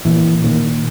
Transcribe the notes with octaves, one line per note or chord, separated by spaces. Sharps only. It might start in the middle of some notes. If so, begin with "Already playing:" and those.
A#2 E3
A#2 D#3